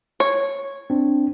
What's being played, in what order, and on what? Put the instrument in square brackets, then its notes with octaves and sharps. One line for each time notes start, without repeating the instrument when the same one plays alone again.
[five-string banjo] C#5
[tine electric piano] C4 D4